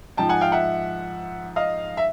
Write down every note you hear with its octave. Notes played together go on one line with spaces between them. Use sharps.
G#2 F3 G5 A5
F#5 G#5
F5 G5
E5 F#5
D#5 F5
E5